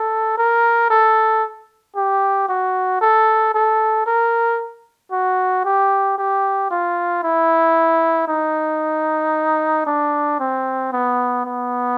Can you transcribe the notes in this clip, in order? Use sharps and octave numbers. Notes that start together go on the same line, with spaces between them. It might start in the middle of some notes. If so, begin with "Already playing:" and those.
Already playing: A4
A#4
A4
G4
F#4
A4
A4
A#4
F#4
G4
G4
F4
E4
D#4
D4
C4
B3
B3